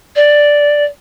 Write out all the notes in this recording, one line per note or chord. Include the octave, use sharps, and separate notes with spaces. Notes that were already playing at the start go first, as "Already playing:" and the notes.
D5